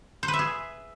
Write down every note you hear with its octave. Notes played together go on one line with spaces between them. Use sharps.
C5
B4
E5
G#4